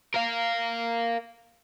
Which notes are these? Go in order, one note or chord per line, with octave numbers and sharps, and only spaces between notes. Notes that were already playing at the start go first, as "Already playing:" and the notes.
A#4 F5